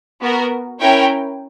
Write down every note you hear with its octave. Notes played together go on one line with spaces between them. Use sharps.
B3 F#4 A#4
C#4 E4 A#4 C#5 G5